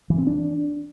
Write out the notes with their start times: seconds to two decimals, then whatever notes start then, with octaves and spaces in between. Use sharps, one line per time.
0.10 E3
0.18 C4
0.27 D4